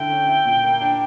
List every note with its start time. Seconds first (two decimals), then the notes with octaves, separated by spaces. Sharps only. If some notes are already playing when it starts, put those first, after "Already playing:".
Already playing: D3 E4 G5
0.10 C#4
0.27 E4
0.46 A#2
0.64 A#3
0.81 D4